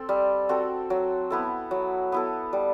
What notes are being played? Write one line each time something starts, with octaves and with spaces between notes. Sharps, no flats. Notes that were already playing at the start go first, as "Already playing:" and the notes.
Already playing: C4 A4
G3
C4 F#4 A4
F#3
B3 E4 A4
F#3
B3 E4 A4
G3